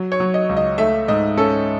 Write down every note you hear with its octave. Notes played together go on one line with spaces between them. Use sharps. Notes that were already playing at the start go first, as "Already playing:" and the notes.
Already playing: F#3
C#5
F#3
D#5
C#2
D#5
A3 E5
G#2 D#5
C#4 A4